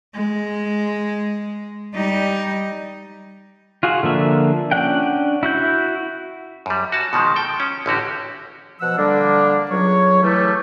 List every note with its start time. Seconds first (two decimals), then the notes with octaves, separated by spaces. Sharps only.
0.15 G#3
1.95 G3 D#4
3.83 F4 F#4 G#4
4.03 D3 F3 A#3 E5
4.71 C#4 D4 F#5 G5
5.43 E4 F#4 G6
6.66 F#2 G3
6.92 F#4 A5
7.13 B2 D#3 F3 G#3
7.36 A4 G5
7.60 C#4
7.86 A1 D3 F#4 G4
8.81 B2 F3 F#5 E6
8.98 D3 G3 A#3 D4
9.70 C#2 F#3 C#5
10.23 E3 F#3 G3 A3